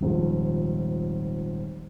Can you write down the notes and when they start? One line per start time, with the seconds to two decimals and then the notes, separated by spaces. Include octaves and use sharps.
0.01 D#1 G#1 F3